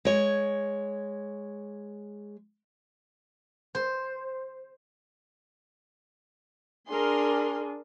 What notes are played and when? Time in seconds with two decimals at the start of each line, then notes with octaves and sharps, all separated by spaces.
0.05 G#3 C#5
3.75 C5
6.90 D4 G#4 A#4 C6